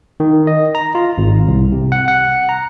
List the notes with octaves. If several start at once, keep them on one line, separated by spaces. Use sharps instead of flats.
D#3
D#5
A#5
F4
G#1
C2
C3
F#5
F#5
A#5